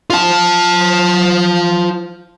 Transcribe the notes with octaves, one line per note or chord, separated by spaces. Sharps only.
F4 A5